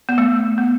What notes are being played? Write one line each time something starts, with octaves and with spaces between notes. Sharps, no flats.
B3
A3
B3